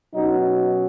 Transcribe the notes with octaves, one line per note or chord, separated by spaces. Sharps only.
B2 F#3 C#4 D#4